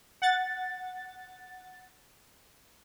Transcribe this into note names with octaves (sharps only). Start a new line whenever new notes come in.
F#5 A6